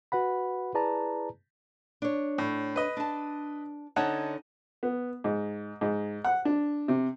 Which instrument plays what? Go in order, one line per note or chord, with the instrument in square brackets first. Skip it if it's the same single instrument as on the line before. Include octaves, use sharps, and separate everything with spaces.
[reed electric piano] F#4 B4 F#5 B5
E4 G#4 B4 D5 A5 A#5
[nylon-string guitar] D4 C#5
[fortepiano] A2
B4 D#5
[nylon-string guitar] D4 A5
[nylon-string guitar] D3 C#4 C#5 [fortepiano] D#4 F#5 A5
[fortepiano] B3
G#2
G#2
F#5
D4
C3